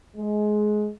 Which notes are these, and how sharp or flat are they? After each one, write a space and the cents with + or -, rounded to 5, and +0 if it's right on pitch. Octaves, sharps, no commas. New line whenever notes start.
G#3 +20